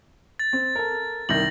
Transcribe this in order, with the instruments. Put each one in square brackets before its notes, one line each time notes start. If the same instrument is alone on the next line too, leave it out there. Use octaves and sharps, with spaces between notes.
[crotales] A6
[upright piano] C4
A4 A#4
[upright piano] C2 D#3 G6 [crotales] A#6 F#7